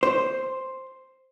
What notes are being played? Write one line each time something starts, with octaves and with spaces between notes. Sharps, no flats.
C5